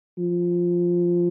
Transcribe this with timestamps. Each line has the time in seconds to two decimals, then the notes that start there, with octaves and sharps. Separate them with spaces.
0.18 F3